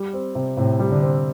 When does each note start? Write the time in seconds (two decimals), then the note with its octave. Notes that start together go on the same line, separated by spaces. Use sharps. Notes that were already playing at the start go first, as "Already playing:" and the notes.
Already playing: G3
0.13 C4
0.35 C3
0.57 A2 C3
0.79 G3
0.91 D3
1.02 C4